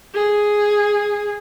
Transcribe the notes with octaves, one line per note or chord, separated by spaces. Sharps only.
G#4